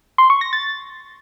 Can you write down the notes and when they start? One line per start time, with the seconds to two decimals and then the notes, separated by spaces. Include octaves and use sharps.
0.18 C6
0.30 C#6
0.41 A#6
0.53 A6